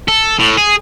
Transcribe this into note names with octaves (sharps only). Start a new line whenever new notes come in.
A4
A2
G#4